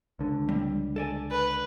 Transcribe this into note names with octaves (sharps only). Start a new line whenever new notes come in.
C#2 D3
G3 C4
A4 D5 G#5
B4